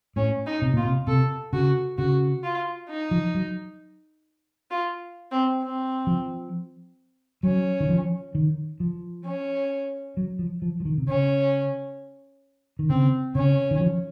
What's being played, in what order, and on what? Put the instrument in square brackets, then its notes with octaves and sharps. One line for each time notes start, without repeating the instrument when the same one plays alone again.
[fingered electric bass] A2 [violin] C#4
[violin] D#4
[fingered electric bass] C3
[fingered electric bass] A#2 [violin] F4
[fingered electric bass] C3
[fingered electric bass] C3 [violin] A4
[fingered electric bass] C#3 [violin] F#4
[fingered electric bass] C#3 [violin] F#4
[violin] F4
D#4
[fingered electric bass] F3
F#3
[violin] F4
C4
C4
[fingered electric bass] F3
[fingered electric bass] F#3 [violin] C#4
[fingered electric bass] D#3
F3
D#3
F3
[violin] C#4
[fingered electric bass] F#3
F3
F3
F3
D#3
C3
[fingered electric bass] C#3 [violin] C#4
[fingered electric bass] D#3
[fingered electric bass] C#3 [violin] C4
[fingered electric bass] C#3 [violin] C#4
[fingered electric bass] D#3
F3